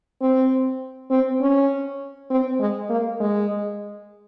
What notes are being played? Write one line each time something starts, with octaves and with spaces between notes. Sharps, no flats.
C4
C4
C#4
C4
G#3
A#3
G#3